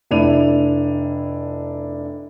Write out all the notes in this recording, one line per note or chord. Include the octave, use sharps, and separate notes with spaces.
F1 D4 E4 D#7 F7